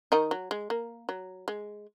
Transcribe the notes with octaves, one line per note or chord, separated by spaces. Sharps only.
D#3 D#4
F#3
G#3
A#3
F#3
G#3